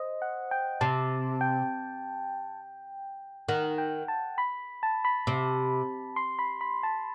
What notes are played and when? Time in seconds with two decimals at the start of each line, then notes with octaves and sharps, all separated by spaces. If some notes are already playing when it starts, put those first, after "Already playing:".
Already playing: C5 D#5
0.22 F#5
0.51 G5
0.81 C3 A5
1.41 G5
3.49 D#3 F#5
3.78 G5
4.08 A5
4.38 B5
4.83 A5
5.05 B5
5.27 C3
6.16 C6
6.39 B5
6.61 B5
6.83 A5